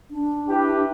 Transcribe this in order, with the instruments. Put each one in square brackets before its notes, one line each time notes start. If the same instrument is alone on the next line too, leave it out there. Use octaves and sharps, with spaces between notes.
[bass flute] D4
[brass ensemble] E4 G4 B4